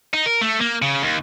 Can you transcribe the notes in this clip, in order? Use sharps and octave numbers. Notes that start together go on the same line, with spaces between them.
D#4
A#4
A3
A#3
C#3
D#2